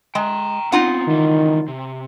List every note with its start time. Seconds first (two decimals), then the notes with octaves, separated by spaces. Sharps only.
0.15 G#3 G5 A#5
0.72 B3 C4 D#4 F4 F#5
1.07 C#2 D#3 E3
1.68 C3